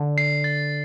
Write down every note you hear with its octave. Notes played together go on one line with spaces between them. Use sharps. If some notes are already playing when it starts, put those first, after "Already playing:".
Already playing: D3
C7
A6